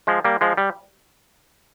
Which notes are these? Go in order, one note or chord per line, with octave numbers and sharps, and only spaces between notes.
F3 G#3
G3 A#3
F3 G#3
G3